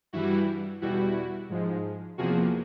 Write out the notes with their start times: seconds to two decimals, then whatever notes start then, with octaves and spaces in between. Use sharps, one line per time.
0.13 G2 E3 G3 E4 F#4
0.81 E2 B2 G3 E4 F#4
1.49 G#2 F3 G#3
2.18 E2 C3 F3 A#3 F#4 G#4